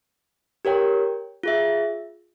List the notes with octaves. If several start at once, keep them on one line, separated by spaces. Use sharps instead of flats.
G4 A#4 C#5 G5
F4 G#4 E5